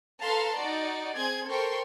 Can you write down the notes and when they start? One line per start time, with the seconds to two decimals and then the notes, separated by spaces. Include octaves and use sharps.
0.22 A4 B4 F5 A5 A#5 C6
0.57 D#4 F#4 D5
1.16 C4 G#4 C6 G#6
1.48 A4 A#4 C5 G5 C6 C#6